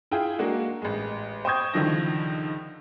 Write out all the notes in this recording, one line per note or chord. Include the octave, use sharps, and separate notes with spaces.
E4 F4 G#4 G5
G#3 A#3 D4 F#4
A1 G#3
C5 G5 C#6 D#6 G6 G#6
C#2 D3 D#3 F3 E4 A#6